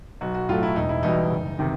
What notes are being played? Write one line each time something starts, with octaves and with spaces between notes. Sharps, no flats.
B1 F#4
F#4
A2 F#3 A3 F4
E4
E1 D#4
E4
E2 B2 G3 D#4
F#1
C3 D#3